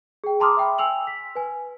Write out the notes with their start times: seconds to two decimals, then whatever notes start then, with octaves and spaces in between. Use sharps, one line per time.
0.24 G#4 G5
0.40 A5 A#5 C6 D6 D#6 F6
0.57 E5 G5 B5
0.78 G5 G#5 E6 F7 F#7
1.07 B6
1.35 B4 G#5